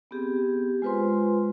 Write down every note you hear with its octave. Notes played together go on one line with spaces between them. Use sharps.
B3 C4 G4 G#4
G#3 F4 B4 C5 C6